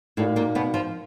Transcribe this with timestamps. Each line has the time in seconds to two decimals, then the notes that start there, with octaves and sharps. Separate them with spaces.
0.17 A2 A3 D#4 F#4 A#4 D5 F5
0.36 A#2 A#3
0.55 B2 B3
0.74 F3 F4